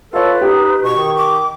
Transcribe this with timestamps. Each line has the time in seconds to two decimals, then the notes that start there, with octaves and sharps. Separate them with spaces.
0.13 F4 A4 B4 C#5
0.42 D#4 G4
0.83 B2 C#6
0.96 D#3
1.17 D6